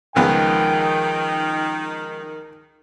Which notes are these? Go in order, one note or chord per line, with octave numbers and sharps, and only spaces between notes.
C#2 D#3 F3 G#3 B3 D#4 G5